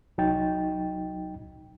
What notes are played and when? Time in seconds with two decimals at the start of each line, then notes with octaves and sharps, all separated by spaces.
0.18 C2 F#3 D#4 G5 A6